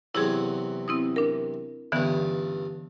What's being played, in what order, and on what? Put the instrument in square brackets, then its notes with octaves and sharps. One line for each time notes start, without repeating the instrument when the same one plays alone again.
[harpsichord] E2 C3 F#3 [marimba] E4 G#4
[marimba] C4 E4 D#6
D4 A#4
[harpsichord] C#2 G2 [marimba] D3 E3 B3